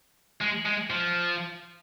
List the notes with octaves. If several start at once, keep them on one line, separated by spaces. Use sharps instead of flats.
G#3
G#3
F3